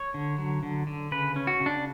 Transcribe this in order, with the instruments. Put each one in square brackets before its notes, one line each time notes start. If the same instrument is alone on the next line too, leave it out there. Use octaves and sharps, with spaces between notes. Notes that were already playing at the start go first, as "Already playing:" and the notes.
Already playing: [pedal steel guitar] C#5
D3
F#3
D3
D3
C#3 B4
C#4
F#4
C#3
D4